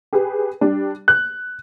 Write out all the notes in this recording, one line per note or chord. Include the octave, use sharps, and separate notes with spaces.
G4 G#4 B4
G3 D4
F#6